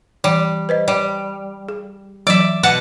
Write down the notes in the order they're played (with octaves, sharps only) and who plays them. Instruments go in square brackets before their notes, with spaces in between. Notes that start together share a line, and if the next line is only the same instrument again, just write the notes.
[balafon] E3 [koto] G3
[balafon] B4 C5 D#5
[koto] G3
[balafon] G#4
[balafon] E3 F#3 [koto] D5 E5
[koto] B2 F#5 A5